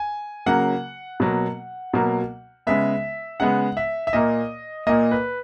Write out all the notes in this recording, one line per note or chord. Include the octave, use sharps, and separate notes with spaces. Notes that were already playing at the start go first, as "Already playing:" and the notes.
Already playing: G#5
C#3 F#3 A#3 F#5
B2 F#3 A#3
B2 F#3 A#3
C#3 G#3 B3 E5
C#3 G#3 B3 F#5
E5
E5
A#2 A#3 D#5
A#2 A#3 D#5
B4